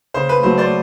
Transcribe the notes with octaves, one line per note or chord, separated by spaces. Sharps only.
C#3 C5
B4
F#3 A3 C5
C5 D5